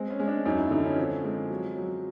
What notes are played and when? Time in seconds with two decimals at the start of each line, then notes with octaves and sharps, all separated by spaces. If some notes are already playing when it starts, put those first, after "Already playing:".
Already playing: G#3 C4
0.10 C#4
0.19 G#3
0.28 D4
0.46 F#2 D#4
0.58 E4
0.71 D3 D#4
0.84 C#4
0.97 F3 C4
1.24 G#3
1.50 F#3
1.76 F#3